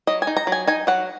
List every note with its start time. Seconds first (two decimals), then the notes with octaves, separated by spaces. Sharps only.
0.07 F#3 D#5
0.22 G#5
0.27 D#4
0.37 A#5
0.47 F#3
0.52 G#5
0.67 D#4 G#5
0.87 F#3 F#5